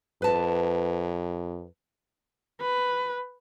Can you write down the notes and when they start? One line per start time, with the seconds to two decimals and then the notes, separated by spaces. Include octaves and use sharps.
0.22 F2 B4 A5
2.61 B4